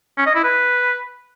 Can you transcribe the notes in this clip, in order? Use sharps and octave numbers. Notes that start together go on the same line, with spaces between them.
C#4
D#5
E4
B4